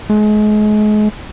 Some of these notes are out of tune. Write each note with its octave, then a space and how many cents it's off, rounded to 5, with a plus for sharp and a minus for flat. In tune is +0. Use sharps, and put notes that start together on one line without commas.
G#3 +35